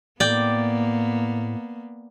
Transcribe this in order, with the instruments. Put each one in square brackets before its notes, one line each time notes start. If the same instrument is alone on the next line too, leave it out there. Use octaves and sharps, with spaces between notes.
[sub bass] A2 [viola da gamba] A#3 B3 [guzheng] D5 G5